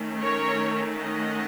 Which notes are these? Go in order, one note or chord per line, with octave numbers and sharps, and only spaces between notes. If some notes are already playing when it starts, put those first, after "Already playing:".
Already playing: D#3 A3 C#4
A#4 C#5
D#5 F#5